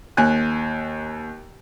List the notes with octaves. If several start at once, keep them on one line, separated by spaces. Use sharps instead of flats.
D#2 G#5 F#6